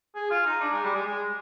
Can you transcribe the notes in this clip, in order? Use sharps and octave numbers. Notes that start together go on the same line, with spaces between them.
G#4
F4
D#4
D4
G#3
G3
G#3
G#3